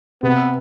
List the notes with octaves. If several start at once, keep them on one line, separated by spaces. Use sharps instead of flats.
C3 B3